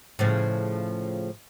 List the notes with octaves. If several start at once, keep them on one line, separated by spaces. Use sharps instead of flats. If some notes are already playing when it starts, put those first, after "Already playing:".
A2 C#3 F3